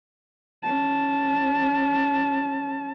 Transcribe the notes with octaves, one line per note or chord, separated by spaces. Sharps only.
C#4 A5